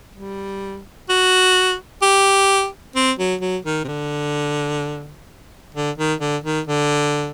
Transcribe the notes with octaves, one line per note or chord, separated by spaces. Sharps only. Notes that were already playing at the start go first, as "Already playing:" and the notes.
G3
F#4
G4
C4
F#3
F#3
D#3
C3
D3
D3
D#3
D3
D#3
D3